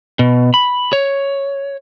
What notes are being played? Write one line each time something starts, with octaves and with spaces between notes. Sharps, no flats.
B2
B5
C#5